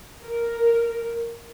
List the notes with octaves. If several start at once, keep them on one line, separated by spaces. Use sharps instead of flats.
A#4